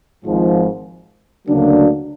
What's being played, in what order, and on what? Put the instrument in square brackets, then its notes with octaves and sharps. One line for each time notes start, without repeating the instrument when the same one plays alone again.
[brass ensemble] G#1 G#2 F3
D2 C#3 F#3 A#3 D4